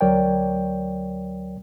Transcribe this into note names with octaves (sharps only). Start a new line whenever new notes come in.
D2 F#3 A#4 C#5 D5 G5